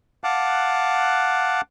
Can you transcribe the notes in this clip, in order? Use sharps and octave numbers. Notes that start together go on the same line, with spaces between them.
F5 F#5 A5 D6 F#6